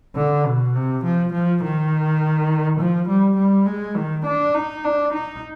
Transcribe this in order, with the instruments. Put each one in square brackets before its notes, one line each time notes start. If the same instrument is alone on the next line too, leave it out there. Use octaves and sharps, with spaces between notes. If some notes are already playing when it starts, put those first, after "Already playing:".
[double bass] D3
B2
C3
F3
F3
D#3
F3
G3
G3
G#3
D#3
D4
D#4
D4
D#4